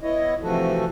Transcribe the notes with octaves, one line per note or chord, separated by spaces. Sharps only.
B3 E4 C#5 D#5
C3 E3 F3 A3 F#4 A4